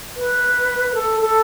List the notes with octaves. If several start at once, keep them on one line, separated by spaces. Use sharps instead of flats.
B4
A4
A4